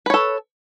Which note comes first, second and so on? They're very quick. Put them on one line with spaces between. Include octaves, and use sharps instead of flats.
B4 C#5 A4